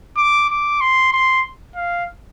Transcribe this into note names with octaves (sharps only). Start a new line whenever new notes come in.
D6
D6
C6
C6
F5